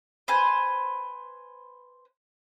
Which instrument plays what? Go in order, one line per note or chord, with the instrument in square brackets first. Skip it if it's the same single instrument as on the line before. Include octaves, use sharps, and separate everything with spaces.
[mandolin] B4 C5 G#5